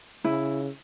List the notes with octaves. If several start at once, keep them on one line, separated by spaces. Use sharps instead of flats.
C#3 E4